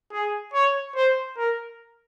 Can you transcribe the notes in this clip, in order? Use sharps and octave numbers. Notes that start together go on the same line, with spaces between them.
G#4
C#5
C5
A#4